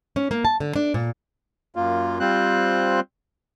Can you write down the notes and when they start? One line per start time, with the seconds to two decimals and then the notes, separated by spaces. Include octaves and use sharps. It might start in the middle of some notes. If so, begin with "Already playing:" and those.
0.16 C#4
0.31 A#3
0.45 A5
0.60 D3
0.76 D4
0.94 A#2
1.76 F#2 A#3 F4
2.20 G3 C4 F4 C5 F#6